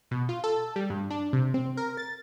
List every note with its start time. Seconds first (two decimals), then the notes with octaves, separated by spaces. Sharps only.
0.11 B2
0.29 F4
0.44 A4
0.76 G3
0.90 G2
1.10 D4
1.33 C3
1.54 C4
1.77 A#4
1.97 A6